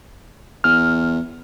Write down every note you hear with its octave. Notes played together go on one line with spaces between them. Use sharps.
E2 F6